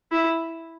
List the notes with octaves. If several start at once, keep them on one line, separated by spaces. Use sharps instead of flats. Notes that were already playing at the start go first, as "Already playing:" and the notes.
E4